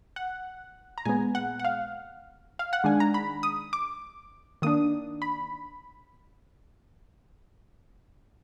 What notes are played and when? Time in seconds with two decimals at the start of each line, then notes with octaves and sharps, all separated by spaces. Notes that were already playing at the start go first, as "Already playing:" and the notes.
0.16 F#5
0.98 A#5
1.05 A#2 G#3 B3 G#5
1.35 F#5
1.60 F#5
1.65 F5
2.59 F5
2.73 F#5
2.84 D#3 G#3 D4 G#5
3.00 A#5
3.14 B5
3.43 D#6
3.73 D6
4.62 D#3 A#3 D4 D#6
5.22 B5